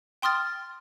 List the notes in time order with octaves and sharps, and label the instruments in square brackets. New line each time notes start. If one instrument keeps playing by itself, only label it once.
[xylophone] G5 C6 D#6 F6 A6